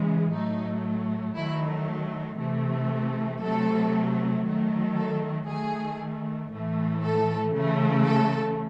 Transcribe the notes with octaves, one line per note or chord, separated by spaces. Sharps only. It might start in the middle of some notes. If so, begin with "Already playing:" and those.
Already playing: C#3 E3 G#3
A2 F#3 A3 D#4
D#3 F#3 A3 E4
C3 E3 A3
C3 F#3 A3 A4
D#3 F#3 A3
A4
D#3 A3 G#4
A2 E3 A3
A4
C#3 E3 A3
A4